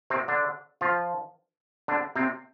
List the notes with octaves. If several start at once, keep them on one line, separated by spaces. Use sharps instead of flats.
C3 C4
D3 D4
F3 F4
D3 D4
C3 C4